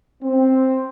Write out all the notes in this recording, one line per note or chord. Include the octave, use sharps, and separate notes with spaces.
C4